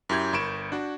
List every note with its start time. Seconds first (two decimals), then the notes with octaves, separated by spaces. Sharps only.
0.09 F#2 E4 G4 G6 G#6
0.33 G1 A#4 B5 C#6 D7 E7
0.72 D4 F#4